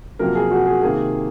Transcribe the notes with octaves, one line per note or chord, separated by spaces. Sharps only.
F2 C3 F#3 A#3 A#4
G#4
F#4
G#4
C3 D#3 A#3 G#4